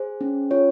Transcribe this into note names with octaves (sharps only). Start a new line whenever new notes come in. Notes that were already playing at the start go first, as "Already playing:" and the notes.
Already playing: G#4 C5
C#4
F4 C#5